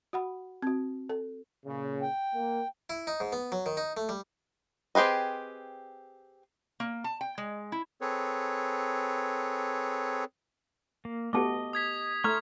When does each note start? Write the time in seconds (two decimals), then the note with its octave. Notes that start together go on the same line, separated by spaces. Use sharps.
0.13 F#4 F#5 B5
0.62 C4 F#4
1.09 A4
1.66 A#2 C#3
2.02 G5
2.35 A#3
2.90 E4
3.07 D#4
3.20 G#2
3.32 B3
3.52 F#3
3.66 D#3
3.77 D#4
3.97 A3
4.09 G3
4.95 C4 G4 G#4 B4 D#5
6.80 A#3
7.04 A5
7.21 G5
7.38 G#3
7.72 E4
8.01 C4 G#4 A4 B4 C#5
11.05 A#3
11.33 A3 B3 F#4 G4 D#5 A5 D6
11.73 D#6 G#6 B6
12.24 A3 A#5 C6 C#6 F6 G#6